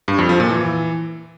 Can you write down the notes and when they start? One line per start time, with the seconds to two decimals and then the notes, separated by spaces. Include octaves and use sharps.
0.08 G2
0.18 F2
0.29 F3
0.40 A#2
0.50 E3